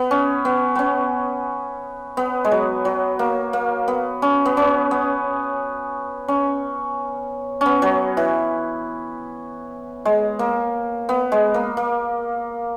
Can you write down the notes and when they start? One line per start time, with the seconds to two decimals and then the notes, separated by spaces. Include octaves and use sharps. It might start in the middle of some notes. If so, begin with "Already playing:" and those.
Already playing: B3
0.11 C#4
0.45 B3
0.75 B3 C#4
2.17 B3
2.45 G#3
2.52 F#3
2.85 F#3
3.19 A#3
3.53 A#3
3.88 B3
4.22 C#4
4.45 B3
4.57 C#4
4.91 B3
6.28 C#4
7.61 B3 C#4
7.82 F#3
8.17 E3
10.05 G#3
10.39 A#3
11.09 B3
11.32 G#3
11.54 A#3
11.77 A#3